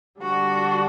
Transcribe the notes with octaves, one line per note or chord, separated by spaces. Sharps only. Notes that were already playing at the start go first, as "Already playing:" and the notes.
D3 G3 D4 F#4